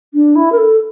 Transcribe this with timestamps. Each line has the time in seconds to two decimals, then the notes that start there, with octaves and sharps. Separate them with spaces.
0.14 D4
0.35 E4
0.52 A#4
0.57 A4